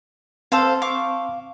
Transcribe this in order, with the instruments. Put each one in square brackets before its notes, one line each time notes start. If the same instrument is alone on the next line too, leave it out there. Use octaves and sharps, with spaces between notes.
[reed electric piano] C4 C6 E6 [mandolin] A4 C5 F5
[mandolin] F5 C#6 D6